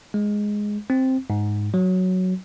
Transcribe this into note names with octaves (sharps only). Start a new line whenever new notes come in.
G#3
C4
G#2
F#3